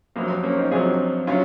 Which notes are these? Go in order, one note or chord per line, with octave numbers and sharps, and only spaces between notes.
F2 C3 F#3 A#3
C4
A#3 C#4
C4 D#4
F2 C3 F#3 F4 G#4
C3 F#3 C#4 F4